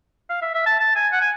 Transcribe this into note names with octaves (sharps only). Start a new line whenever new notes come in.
F5
E5
E5
A5
A5
G#5
F#5
G#5